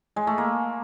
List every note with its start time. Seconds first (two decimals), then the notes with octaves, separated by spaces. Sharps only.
0.16 G#3
0.27 A3
0.38 A#3